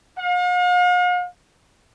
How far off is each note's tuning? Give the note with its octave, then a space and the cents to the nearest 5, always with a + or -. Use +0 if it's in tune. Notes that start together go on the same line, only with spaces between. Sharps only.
F5 +45